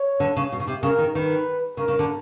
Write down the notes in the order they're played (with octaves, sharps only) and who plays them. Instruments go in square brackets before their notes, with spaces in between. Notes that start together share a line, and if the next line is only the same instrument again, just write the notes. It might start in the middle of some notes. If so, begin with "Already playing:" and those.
Already playing: [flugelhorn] C#5
[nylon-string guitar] D3
C#3
B2
C#3
C3
[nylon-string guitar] C#3 [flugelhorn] A#4
[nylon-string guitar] D#3
[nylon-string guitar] D#3 [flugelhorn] B4
[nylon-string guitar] C#3 [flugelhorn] A#4
[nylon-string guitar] C#3
D3